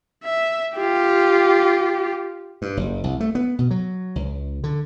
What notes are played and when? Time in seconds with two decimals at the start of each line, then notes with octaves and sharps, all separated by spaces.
0.24 E5
0.76 F4 G4
2.62 G2
2.77 F#1
3.04 C2
3.20 A3
3.35 B3
3.59 B2
3.71 F#3
4.16 C#2
4.64 D3